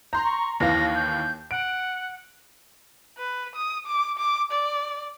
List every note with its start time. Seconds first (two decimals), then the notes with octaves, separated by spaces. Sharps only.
0.13 A#5 C6 G6
0.24 C#6
0.60 D#2 E3 F5 A#6
0.96 G6
1.51 F#5 D7
3.18 B4
3.56 D#6
3.86 D6
4.18 D6
4.52 D5